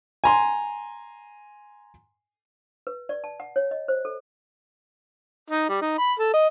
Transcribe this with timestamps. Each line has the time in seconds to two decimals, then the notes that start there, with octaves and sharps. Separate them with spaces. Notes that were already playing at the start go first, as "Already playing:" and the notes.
0.24 G#5 A#5 C6
2.87 B4
3.09 D5
3.24 A5
3.40 F#5
3.56 C#5
3.71 D#5
3.88 C5
4.05 A4
5.50 D#4
5.69 G3
5.81 D#4
5.98 B5
6.19 A4
6.34 D#5